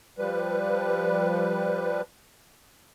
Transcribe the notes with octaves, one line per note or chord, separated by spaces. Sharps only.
F3 G3 B4